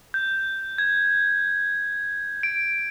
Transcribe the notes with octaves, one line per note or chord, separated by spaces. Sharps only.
G6
G#6
D7